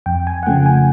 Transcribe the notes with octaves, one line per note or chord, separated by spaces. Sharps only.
F2 G5
G#5
F#5
C#3 F3 A3 G5
G#5